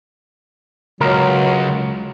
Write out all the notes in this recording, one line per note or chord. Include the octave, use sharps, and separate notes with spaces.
C#2 F#3 A#4